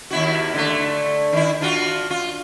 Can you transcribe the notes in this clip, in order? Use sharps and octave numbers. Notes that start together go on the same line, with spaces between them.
D#2 E4 F#4
D3 A3
D#3 E4
D4 F4 F#4
F4